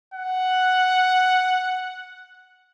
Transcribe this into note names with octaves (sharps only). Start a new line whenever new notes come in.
F#5